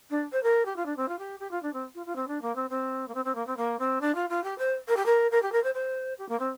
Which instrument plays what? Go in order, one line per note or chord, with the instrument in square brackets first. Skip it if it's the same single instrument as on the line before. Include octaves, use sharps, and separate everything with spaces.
[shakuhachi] D4
C5
A#4
G4
F4
D4
C4
F4
G4
G4
F4
D4
C4
F4
F4
C4
D4
A#3
C4
C4
A#3
C4
C4
A#3
C4
A#3
C4
D4
F4
F4
G4
C5
A#4
G4
A#4
A#4
G4
A#4
C5
C5
G4
A#3
C4